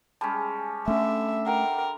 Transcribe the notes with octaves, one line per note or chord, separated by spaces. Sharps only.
G3 G#3 C#4 A5
D3 A3 C#4 E5
A#4 F#5 G5